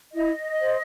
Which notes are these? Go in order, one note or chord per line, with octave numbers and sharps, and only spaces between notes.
E4 D#5
C5